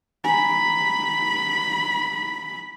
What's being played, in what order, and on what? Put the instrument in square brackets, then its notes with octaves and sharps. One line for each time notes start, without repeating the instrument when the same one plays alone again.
[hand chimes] G#5 A#5 [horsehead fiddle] B5